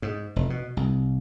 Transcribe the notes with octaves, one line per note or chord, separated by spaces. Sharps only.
G#2
F1
B2
C2